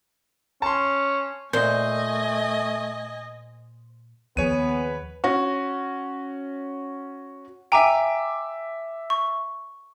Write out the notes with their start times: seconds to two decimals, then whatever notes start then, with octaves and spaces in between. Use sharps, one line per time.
0.62 C#4 A5 C6
1.53 A#2 A3 C5 D#5 G#5
4.37 D#2 F3 B3 G#4 B4 C#5 D#7
5.24 C#4 F#4
7.72 E5 G5 G#5 A#5 D6 D7
9.10 C#6